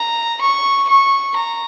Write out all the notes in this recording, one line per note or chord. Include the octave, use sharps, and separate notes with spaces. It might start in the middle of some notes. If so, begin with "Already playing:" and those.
Already playing: A#5
C#6
C#6
A#5